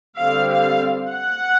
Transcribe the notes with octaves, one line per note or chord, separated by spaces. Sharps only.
D3 G3 C4 F5
F5
F#5